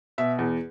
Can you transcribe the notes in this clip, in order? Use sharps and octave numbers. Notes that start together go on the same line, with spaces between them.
B2 E5
E2